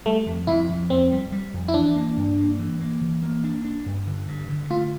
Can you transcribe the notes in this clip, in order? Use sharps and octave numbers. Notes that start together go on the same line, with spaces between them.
G3 A3
F2
F2 E4
F2
F2 C4
G3
G3
F2
E4
E3 D4
A#3
G2
A#3
E3
A#3
E3
A#3
D4
D4
G2
D3
G2
D3
A3 F4